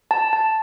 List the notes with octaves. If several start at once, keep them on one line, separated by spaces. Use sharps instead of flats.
A5
A5